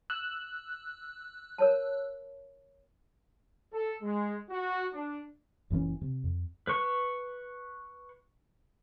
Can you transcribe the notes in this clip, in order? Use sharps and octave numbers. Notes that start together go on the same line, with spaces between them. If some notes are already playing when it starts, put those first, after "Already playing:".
E6 F#6
A#4 C#5 A5
A4
G#3
F#4
D4
F#1 A#2 E3 C#4
C3
F2
B4 C#6